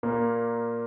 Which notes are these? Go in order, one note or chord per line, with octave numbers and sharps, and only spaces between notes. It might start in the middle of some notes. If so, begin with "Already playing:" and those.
A#2 A#3